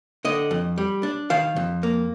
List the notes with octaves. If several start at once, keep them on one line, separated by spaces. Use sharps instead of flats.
D3 D#5
F2
G3
D4
D#3 F5
F2
A#3